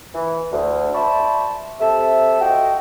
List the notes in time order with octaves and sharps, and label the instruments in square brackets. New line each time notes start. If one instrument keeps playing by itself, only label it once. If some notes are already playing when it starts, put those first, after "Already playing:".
[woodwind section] E3
D2
C5 D5 E5 A5 B5 C#6
C3 A4 E5
F4 F#4 D#5 G5